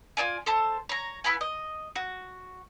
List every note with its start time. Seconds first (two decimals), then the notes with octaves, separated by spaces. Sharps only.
0.17 F4 C#5 D5 G#5
0.46 A4 C5 A5
0.89 C#5 A#5
1.24 E4 B4 F#5 G#5
1.41 D#5
1.96 F#4